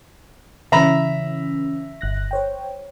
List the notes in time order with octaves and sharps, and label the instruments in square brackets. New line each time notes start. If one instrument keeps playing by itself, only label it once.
[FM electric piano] C#3 E3 C#4 [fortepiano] E5 A#5 B5
[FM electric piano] G1 F#6 A#6
C5 C#5 G5